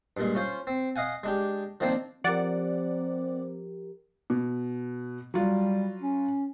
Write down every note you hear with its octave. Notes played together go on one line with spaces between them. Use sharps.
G2 A#2 G#3
C#4 F4 C5
C4
D#5 F5 F#5 G#5
G#3 D4 G4
D#3 F3 A#3 C4 D4
F3 C4 G4 A#4 D5 F#5
B2
F#3 G3 F4
C#4